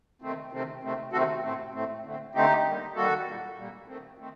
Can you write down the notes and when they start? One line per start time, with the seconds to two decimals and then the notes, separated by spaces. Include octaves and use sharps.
0.22 C3 D#3 A3 C4
0.52 C3 D#3 A3 C4
0.82 C3 D#3 A3 C4
1.12 C3 D#3 A3 C4 F#4 A4
1.43 A2 A3 C4
1.74 A2 A3 C4
2.04 D3 A3 C4
2.34 D3 A3 C4 D#4 G4
2.65 D#3 G3 A#3
2.96 D#3 G3 A#3 F#4 A4
3.26 A#2 G3 A#3
3.57 A#2 G3 A#3
3.87 D#3 A3 C4
4.18 D#3 A3 C4